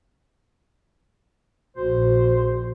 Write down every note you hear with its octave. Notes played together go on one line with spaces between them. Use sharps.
A#1 F#4 C5